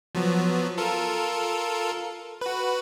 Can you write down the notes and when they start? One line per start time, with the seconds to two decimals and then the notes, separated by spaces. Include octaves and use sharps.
0.15 F3 F#3 B3
0.77 F4 A4 A#4
2.41 F#4 B4